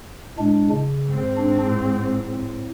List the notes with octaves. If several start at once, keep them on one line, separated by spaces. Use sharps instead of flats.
A2 G#3 D4
C#3
G#2 C4
D4
A2